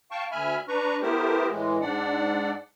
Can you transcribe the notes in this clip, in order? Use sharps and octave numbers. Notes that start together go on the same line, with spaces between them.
F5 G5 A5 C#6
D2 E5 G#5 B5 F6
D4 B4 A#5 C#6
A3 B3 E4 G4 A#4 C5
A2 E3 G#3
G#2 D4 D5 F#5